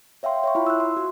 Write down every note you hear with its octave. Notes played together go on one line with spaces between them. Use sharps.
C#5 E5 F5 G5 C6
C#5 E5 C#6
E4 F4 B5 C6
E6 F#6
C6
F#4